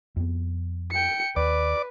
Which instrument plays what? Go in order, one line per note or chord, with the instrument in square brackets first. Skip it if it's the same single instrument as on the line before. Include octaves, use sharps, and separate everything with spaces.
[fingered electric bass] F2 B3
[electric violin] G5 C#7
[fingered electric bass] D#2 [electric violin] B4 [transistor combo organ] D5 D6